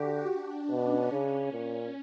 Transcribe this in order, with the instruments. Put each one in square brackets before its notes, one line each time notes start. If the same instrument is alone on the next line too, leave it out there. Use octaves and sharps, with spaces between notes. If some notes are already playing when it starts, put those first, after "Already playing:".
Already playing: [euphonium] D3 [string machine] F#4 G4
[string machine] D4
[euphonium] B2 [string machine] C#4
[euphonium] C#3 [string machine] C#4
[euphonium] A#2